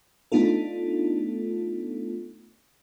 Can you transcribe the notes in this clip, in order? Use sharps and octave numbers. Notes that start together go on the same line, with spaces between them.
A3 B3 D4 D#4 F4 A4